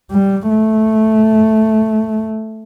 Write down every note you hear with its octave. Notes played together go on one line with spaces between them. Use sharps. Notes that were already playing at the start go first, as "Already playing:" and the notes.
G3
A3